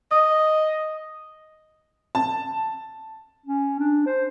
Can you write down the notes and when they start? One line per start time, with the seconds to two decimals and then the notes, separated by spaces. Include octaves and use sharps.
0.11 D#5 D#6
2.15 A5
3.46 C#4
3.79 D4
4.06 C5